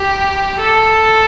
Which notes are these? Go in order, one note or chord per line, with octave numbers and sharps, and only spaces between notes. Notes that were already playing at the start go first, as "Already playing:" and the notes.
Already playing: G4
A4